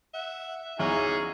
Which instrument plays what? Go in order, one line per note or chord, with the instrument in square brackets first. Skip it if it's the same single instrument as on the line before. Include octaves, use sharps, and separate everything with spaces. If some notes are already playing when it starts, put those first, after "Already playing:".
[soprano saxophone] E5 [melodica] F#5
[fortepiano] E2 [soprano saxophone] C#4 [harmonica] D#4 G#4 G#5 [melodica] F#4 F5 A#5